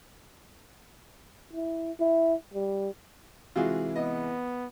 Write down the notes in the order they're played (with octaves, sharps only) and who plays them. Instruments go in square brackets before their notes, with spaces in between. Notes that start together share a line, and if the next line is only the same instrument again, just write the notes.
[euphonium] E4
E4
G3
[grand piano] C3 E3 G#3 [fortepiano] F4 F#4 G#4
[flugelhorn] B3 [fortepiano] D#5